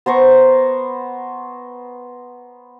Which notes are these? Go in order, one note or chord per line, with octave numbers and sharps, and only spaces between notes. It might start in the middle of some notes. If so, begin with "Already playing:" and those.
B3 C5 A#5 C#6